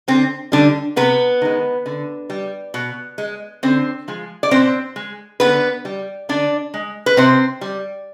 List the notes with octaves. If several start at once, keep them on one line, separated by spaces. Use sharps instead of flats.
D3 C4
D3 G3 D4
C3 B3 B4
D#3 G#3
D3
G3
B2
G#3
D3 C4 C5
F3 G#3
D5
B2 C4 C5
G#3
D3 B3 B4
G3
D3 D4 D5
G#3
B4
C3 C4 C5
G3